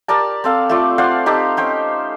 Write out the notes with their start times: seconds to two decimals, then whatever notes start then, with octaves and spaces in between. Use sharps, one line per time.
0.08 G4 A#4 D5 A5
0.44 C4 A4 F5
0.69 A3 F4 D5
0.98 C5 D5 F5 F#5
1.26 D#4 G4 A4
1.57 C#4 C5 G5